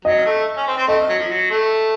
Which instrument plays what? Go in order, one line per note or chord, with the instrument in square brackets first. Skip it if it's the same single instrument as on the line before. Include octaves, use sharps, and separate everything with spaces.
[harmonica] F#3 [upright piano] D#5
[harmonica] A3
C#4
C4
C4
[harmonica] A3 [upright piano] D#5
[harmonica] F#3
F3
F#3
A3